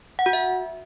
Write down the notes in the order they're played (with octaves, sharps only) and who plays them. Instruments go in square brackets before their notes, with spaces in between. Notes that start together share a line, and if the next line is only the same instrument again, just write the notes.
[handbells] F#5
F#4
E5